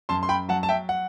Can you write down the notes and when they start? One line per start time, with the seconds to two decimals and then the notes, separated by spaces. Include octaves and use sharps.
0.09 F#2 A5 C6
0.23 C6
0.29 G5 B5
0.49 F#3 F#5 A5
0.63 A5
0.69 E5 G5
0.89 F#5